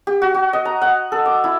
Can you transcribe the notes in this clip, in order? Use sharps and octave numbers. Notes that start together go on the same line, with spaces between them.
G4
F#4
F#4
D#5
A#5
F#5
A4
D6
E4